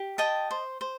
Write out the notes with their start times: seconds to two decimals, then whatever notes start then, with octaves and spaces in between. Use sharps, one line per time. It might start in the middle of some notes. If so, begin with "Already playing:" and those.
Already playing: G4
0.18 D#5 G5 A5
0.51 C5
0.81 C5